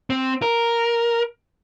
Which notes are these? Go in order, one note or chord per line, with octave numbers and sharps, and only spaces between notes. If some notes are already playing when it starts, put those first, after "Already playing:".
C4
A#4